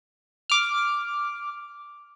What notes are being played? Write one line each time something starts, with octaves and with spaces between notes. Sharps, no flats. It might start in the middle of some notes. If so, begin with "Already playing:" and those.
D6 F6